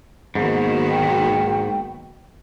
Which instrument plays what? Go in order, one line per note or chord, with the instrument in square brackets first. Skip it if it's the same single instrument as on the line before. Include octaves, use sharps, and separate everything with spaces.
[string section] B1 D#3 [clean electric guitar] G#2 [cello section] A#3 B3 F#4
[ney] G5